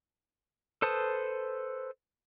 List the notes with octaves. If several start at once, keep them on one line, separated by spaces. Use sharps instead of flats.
A4 B4 C5 A5 D#6